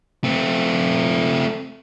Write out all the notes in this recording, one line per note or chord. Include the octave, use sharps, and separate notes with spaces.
A3 C4